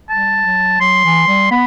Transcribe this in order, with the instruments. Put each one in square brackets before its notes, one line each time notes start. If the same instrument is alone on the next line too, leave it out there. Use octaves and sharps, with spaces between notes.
[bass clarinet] G3 [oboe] A5
[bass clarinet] F#3
[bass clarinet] F#3 [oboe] C6
[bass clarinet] E3
G3
[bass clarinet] B3 [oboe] B5